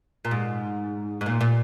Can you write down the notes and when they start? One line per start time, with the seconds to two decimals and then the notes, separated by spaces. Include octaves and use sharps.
0.25 A#2
0.31 G#2
1.21 G#2
1.26 A#2
1.41 A#2